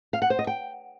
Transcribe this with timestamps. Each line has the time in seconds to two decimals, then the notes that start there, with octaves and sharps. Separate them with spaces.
0.13 F5
0.22 F#5
0.30 C5
0.39 D#5
0.47 G5